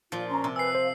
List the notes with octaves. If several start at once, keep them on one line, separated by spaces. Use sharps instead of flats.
A#2 F3 F4
C#4 A#5 C6
C3
B4 G#5 E6 C7
C5 F5